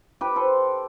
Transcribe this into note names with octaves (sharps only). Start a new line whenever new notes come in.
G4 B4
A4 C5